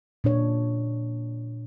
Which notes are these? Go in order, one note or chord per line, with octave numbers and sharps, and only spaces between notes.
A#2 D4 C#5